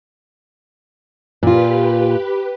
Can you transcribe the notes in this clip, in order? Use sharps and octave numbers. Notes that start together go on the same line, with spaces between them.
A#2 F4 G4 B4